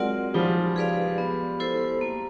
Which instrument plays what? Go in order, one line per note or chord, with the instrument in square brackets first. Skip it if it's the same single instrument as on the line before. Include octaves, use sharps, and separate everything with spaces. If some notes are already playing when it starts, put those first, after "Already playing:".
Already playing: [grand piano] F#3 G#3 [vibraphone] C4 F4 A#4 D5 F#5
[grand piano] F3 G3 [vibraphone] D#4
[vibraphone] G#4 B4 D5 F5
B3
E4 A4 C5
A#3